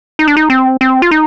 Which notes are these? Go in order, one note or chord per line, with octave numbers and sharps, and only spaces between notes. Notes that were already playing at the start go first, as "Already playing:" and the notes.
D#4
D4
D#4
C4
C4
F4
D#4